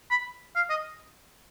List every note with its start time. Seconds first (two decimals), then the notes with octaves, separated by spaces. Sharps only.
0.11 B5
0.56 F5
0.70 D#5